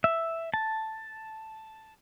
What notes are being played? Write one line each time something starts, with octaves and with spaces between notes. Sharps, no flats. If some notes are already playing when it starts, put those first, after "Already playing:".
E5
A5